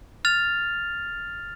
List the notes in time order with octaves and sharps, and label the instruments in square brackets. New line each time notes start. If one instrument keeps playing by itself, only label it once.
[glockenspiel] F6 A6 F7